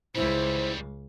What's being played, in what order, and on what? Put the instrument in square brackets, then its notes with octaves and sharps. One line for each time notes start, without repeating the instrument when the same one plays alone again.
[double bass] C#2 [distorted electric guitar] C#3 G3 [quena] E4 [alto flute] C5